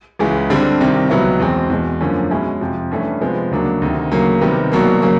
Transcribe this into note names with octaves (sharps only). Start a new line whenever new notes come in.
C#2 C#3 E3 G#3
G2 D3 G3 C4
C2 C3 D#3
C#2 B2 F#3 B3 E4
E2 B2 G#3 C4
E2 B2 G#3
F#2 D3 F3 A#3 C#4
B2 G#3 C#4 E4
F2 C3 F3
G2 E3 A3 C#4
C3 F3 G#3 B3
D2 C#3 F#3 A#3 D4
D2 C3 D#3
D2 C#3 F#3 A#3
C3 D#3 G3 B3
C2 B2 F#3 A#3
C#3 F#3 A#3